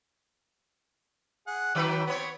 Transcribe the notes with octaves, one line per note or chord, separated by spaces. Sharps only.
G#4 F#5
D#3 F#3 B4 G5 D6
B3 C4 C#5